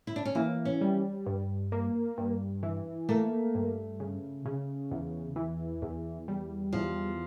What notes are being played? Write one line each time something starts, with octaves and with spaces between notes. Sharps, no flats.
E4
D4
C#4
E3 A#3
C#4
G3
G2
A#3
G2
E3
A3 A#3
G2
C#3
C#3
E2
E3
E2
G3
E2 F3